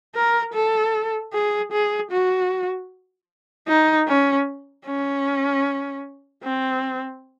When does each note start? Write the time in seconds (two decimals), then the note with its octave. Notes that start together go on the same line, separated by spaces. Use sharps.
0.16 A#4
0.54 A4
1.34 G#4
1.72 G#4
2.11 F#4
3.69 D#4
4.08 C#4
4.86 C#4
6.44 C4